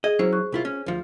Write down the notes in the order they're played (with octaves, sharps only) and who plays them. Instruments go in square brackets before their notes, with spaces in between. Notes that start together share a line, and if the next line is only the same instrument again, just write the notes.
[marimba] G#4 [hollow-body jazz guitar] D#5
[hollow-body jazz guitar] F#3 C#4 E4 [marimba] C5
[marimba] C#6 F#6
[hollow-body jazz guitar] C2 E4 F4
C#4
D2 F3